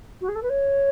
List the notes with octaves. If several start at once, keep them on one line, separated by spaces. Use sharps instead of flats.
F#4
G#4
A4
B4
C#5